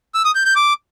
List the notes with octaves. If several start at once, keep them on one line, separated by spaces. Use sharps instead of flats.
E6
D#6
G6
G6
D6